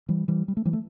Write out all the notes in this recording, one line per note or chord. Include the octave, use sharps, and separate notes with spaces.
E3 G3
E3 G3
G3
A3
E3 G3
A3